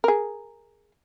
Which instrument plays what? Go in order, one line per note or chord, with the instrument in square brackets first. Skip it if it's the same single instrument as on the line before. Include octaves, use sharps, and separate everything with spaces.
[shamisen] G#4 A#4